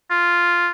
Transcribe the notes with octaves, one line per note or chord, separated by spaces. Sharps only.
F4